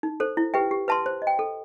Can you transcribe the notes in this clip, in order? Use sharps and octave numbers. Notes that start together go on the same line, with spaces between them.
D#4
A4 C5
E4
G4 B4 E5 G5
G4
B4 E5 A5 C6
C5
D#5
G5
A4